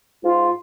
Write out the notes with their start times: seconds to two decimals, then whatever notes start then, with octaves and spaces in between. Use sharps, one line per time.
0.24 G#2 F4